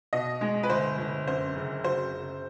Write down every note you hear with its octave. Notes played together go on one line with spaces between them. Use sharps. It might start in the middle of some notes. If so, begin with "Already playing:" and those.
B2 D#5
G#3
B4
G1 C5
G1
F#2 C5
F#1
F#3 C5
F#1